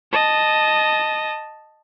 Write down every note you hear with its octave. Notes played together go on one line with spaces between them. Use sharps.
D#5 A5